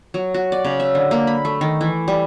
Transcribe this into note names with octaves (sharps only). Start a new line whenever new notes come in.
F#3
F#4
D5
C#3
E5
D3
A#3
B5
A3
D#3
E3
G3